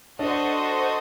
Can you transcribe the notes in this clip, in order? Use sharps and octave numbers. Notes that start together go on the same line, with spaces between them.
D4 F#4 A4 C5 D#5